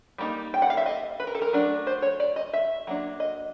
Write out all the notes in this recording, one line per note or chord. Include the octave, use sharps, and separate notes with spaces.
G3 A#3 D#4
G5
F#5
F5
E5
D#5
B4
A#4
A4
A#4
F#3 A3 D4
C5
C#5
D5
D#5
E5
F#3 A#3 D4
D#5